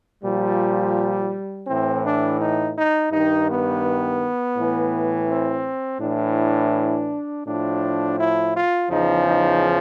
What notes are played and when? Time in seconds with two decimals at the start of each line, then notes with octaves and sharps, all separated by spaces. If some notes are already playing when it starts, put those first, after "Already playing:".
0.22 A#2 F3 G3
1.67 A2 E3 C4
2.03 D4
2.39 D#4
2.75 D#4
3.11 G2 D#3 D#4
3.48 B3
4.56 A2 E3
5.28 C4
6.00 A2 E3 D4
7.45 A2 F3 D4
8.17 E4
8.54 F4
8.90 E2 C#3 F3 D#4
9.25 D#4